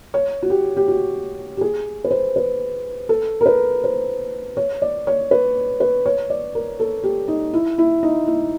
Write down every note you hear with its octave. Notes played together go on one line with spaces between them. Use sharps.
C#5
F#4
G4
G4
F#4
G4
G#4
B4
C5
B4
A4
A#4
B4
C5
C#5
D5
C#5
B4
B4
C#5
D5
A#4
A4
G4
D#4
E4
E4
D#4
E4